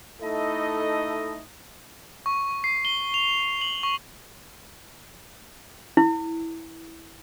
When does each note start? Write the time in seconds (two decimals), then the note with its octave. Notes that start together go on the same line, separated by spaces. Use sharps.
0.21 A3 D#4 E4 A4 D#5
2.26 C#6
2.64 C7
2.85 G7
3.14 F7
3.61 F#7
3.83 C#6
5.97 E4